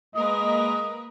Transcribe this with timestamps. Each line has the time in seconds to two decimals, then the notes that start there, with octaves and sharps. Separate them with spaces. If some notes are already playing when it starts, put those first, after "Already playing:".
0.15 G#3 A#3 A#4 B4 D#5 D#6